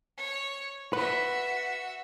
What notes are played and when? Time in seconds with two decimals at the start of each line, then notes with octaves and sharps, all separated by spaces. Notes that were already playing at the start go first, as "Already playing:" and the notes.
0.18 C#5
0.93 F#4 B4 E5